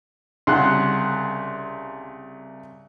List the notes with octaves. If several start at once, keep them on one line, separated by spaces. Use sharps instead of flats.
C2 C#3 F#5 C6 F#6